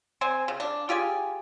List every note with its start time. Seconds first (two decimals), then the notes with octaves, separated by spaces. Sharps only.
0.21 C4 C5 G#5
0.48 C#3
0.60 D4
0.89 F4 G4 G#4 G#5